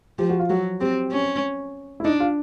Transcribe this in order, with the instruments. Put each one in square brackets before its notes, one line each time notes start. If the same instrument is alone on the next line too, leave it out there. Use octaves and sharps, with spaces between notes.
[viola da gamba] F3 [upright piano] G4
[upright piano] F#4
F4
[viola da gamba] F#3 [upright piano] F#4
[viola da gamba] C4 [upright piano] G4
[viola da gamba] C#4
[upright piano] E4
[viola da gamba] D4 [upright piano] D#4
[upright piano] F4